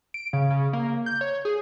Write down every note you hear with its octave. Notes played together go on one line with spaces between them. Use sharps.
D7
C#3
C#3
A#3
G6
C#5
G#4